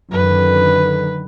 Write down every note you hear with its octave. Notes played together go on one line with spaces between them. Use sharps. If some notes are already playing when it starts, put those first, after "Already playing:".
F#2 D3 D#3 B4